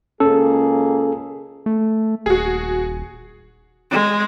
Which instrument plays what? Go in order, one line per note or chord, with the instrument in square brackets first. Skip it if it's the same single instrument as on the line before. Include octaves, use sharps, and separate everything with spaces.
[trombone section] C#2 A#3 G#4 [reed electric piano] C#4 [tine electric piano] A4
[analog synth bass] A3
[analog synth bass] D#1 [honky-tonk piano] F#4 G#4
[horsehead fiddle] G#3